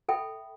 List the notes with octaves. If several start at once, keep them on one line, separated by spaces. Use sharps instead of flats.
A4 E5 G5 B5